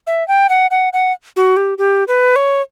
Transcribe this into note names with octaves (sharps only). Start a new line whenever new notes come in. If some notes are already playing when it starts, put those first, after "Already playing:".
E5
G5
F#5
F#5
F#5
F#4
G4
G4
B4
C#5